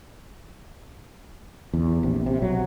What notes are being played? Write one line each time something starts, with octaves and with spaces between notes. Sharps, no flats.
E2
A#1 C3
C3
B1 F#3